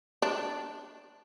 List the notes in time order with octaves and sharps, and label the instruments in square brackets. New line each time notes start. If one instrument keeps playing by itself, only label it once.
[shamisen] D4